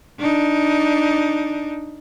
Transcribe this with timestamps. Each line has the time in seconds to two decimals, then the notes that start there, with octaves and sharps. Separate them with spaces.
0.19 D4 D#4